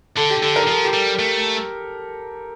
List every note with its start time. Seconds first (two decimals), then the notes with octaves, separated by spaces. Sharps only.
0.17 D3 A4
0.30 G4
0.42 D3 A4
0.56 A#4
0.68 F3 A4
0.84 G4
0.93 G3
1.19 A3